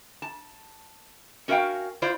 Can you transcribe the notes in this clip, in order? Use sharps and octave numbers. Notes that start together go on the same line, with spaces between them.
A5
C#4 F#4 A#4 D#5 F5 G5
E4 F4 C5 D5